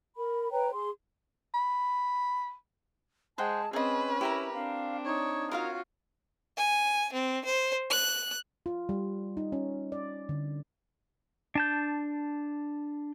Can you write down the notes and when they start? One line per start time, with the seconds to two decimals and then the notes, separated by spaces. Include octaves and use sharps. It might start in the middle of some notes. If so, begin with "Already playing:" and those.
0.16 A#4 B5
0.52 B4 C#5 G5 A#5
0.73 G#4 C6
1.54 B5
3.38 G#3 C5 F#5 G5 A5
3.73 C4 C#4 G#4 B4 C5 D#5
4.21 E4 G4 A#4 A#5
4.54 C4 D4 F5
5.05 D#4 C#5
5.52 F4 F#4 A#4 C#5 F5
6.58 G#5
7.13 C4
7.45 C5
7.90 F#6
8.66 F4
8.89 G3
9.37 D#4
9.52 C#4
9.92 D5
10.29 D3
11.55 D4 A5 G6